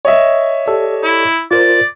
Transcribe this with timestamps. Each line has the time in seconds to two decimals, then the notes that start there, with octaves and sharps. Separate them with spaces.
0.05 C#5 D#5 E5
0.66 G4 A4 D5
1.03 E4
1.51 F4 A#4 C5 D5